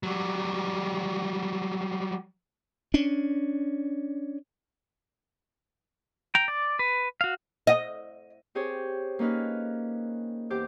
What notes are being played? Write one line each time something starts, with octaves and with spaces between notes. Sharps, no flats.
F#3 G3
C#4 D4
G5 A#5
D5
B4
F#4 F5
D#5
C4 G4 G#4 C5 C#5
A#3 C#4 D#4 B4 F6
E2 G4 C5 D6 G6